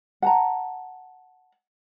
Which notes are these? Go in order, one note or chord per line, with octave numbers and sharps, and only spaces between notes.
F#5 A5 A#5